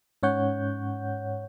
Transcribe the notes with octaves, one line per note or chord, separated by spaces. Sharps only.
G#2 C#4 C#5 F#5 G6